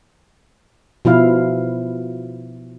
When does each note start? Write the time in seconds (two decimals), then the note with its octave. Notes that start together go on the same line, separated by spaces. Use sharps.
1.05 B2 F3 E4 F5